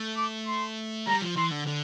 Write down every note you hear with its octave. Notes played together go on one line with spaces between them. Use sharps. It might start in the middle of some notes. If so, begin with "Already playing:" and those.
Already playing: A3
D6
C6
G3 A#5
F3
E3 C6
D3
D3